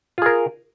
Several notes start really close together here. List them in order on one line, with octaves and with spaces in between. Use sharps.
F4 G#4 A#4